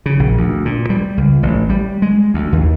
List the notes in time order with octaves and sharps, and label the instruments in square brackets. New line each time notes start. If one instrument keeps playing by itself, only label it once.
[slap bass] C#3
A#1
D2
A#2
G3
C#2
A1
G3
G#3
D2
D#2